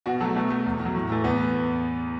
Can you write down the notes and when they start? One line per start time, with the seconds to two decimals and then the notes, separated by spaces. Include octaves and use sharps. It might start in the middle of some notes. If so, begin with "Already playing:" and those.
0.06 B2 F#4
0.20 F#3 A4
0.25 A3
0.36 B2 A3
0.50 A3
0.66 E2
0.80 B2
0.85 F#3
0.95 A2
1.10 E3 A3
1.24 E2 B3